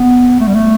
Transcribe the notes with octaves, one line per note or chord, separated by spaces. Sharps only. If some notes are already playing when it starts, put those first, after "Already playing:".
Already playing: B3
A3
G3
A3